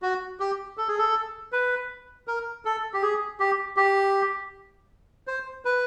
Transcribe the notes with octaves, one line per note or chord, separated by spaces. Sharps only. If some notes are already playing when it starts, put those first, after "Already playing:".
F#4
G4
A4
G#4
A4
B4
A#4
A4
G4
G#4
G4
G4
C5
B4